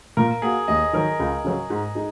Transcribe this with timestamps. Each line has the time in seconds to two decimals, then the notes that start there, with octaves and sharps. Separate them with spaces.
0.17 A#2 A#4
0.42 A#3 F#4 G#4
0.68 D#2 D#5
0.93 D#3 F#3 A#4
1.20 C#2
1.44 C#3 F#3
1.70 G#2
1.95 G#3 D#4